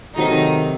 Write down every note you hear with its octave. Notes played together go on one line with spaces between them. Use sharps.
C3 D#3 F#3 A3 D#4